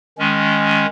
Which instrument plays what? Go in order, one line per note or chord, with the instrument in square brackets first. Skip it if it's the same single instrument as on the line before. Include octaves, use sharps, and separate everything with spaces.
[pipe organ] D#3 G#3 C#4